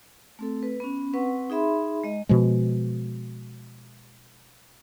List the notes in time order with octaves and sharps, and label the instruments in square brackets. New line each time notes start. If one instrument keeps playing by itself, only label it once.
[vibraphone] A3 C4 A4
B4
B3 C#4
C4 B4 F#5 C#6
D#4 G#4 E5 B5 C6
G#3 D#5
[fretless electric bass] B2 F3 G#3